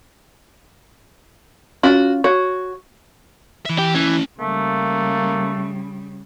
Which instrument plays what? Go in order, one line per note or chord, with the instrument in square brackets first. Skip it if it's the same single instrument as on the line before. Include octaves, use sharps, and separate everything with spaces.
[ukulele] C#4 F4 [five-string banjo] F#4
[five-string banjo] F#4 [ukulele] C#5
[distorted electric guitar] E3 E5
[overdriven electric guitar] G4
[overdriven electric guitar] E3 [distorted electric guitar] C#4 E4
[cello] C#3 G3 [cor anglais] A3 [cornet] A#3